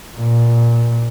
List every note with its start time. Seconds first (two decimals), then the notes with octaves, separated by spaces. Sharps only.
0.18 A#2